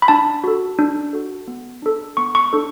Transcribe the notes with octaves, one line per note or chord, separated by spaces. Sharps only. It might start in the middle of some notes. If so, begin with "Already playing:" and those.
B5
D4 A5
F#4 A4
D4
F#4 A4
B3
D4 A4
B3 C#6
C#6
D4 A4